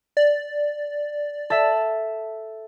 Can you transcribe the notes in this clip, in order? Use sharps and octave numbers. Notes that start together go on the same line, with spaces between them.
D5
A4 E5